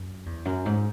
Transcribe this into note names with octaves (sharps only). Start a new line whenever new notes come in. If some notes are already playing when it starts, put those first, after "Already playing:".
Already playing: F#2
E2
F#2
G#2